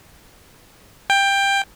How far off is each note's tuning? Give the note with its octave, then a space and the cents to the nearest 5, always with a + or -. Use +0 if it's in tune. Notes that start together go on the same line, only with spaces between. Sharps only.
G5 +15